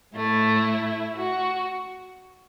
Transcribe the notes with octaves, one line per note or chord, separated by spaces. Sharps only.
A2 A3 E4
F#4